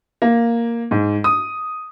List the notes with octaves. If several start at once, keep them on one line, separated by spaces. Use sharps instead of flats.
A#3
G#2
D#6